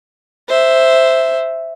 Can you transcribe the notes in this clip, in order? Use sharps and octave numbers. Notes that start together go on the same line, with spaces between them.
C5 E5